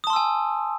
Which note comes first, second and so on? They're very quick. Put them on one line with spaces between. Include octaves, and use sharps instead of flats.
D#6 A5 C6 E6 G#5